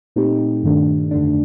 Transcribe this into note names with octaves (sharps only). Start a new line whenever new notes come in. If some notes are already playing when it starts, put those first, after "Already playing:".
A#2 A3 C4 D#4 G4
G2 D#3 A3 D4
F2 D3 A3 D4